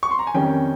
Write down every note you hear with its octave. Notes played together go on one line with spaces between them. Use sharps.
C#6
C6
A#5
G#5
F2 D#3 G3 C#4 G5